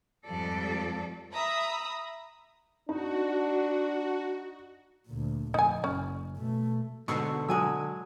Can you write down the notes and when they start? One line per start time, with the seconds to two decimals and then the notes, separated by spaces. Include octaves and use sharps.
0.25 F2 G#2 F3 G3 A4 D5
1.33 E5 A#5 B5 D#6
2.89 D4 D#4 F#4
5.07 D2 A#2
5.54 F1 D#4 G#5
5.84 F#1 C#4
6.36 B2 A3
7.08 G#2 B2 D3 C#6 E6 C7
7.48 F#3 G#3 G#5 E6